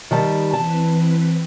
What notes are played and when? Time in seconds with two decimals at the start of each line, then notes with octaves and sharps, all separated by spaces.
0.11 D#3 G3 A5
0.53 E3 C4 B4 A5